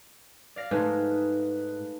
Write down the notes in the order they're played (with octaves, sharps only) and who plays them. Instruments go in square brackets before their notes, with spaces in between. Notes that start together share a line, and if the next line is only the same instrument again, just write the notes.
[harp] D5 F5 A#6
[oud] G#2 [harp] G#3 A3 D#4 [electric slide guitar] B4 A5